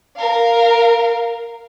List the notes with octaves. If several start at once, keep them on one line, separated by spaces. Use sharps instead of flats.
A#4 F5